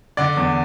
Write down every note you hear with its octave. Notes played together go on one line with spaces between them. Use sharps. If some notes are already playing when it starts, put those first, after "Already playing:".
D3 D5
E2